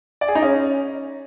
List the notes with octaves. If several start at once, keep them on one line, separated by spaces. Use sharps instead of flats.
D5
G#4
D#4
C#4